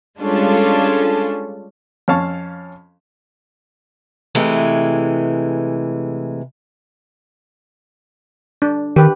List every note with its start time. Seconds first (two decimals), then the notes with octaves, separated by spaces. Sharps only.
0.20 G3 G#3 C#4 D4 F4 A4
2.08 F2 C#4 F5 A5 C#6
4.35 C3 E3 G#3 A3
8.62 D4
8.96 D#3 G4 B4